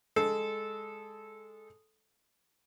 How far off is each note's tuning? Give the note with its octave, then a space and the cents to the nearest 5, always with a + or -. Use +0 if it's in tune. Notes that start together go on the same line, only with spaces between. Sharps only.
G#3 -5 A4 -15